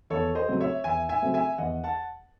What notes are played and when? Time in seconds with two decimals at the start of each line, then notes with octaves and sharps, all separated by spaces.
0.10 E2 A4 C#5
0.35 C5 D#5
0.48 C#3 F#3 A3 C4
0.60 C#5 E5
0.84 E2 E5 G#5
1.09 E5 G#5
1.22 C#3 F#3 A3 C4
1.34 E5 G#5
1.58 E2 D#5 F#5
1.84 F#5 A5